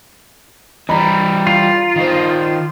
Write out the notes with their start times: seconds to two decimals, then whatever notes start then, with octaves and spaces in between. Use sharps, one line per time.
0.89 E3 G3 A#5 B5
1.47 F4
1.96 D#3 C5